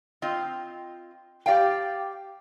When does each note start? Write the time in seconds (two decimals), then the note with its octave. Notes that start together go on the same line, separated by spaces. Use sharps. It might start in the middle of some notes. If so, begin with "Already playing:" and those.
0.22 C4 F4 D#5
1.46 G4 D5 F5 G5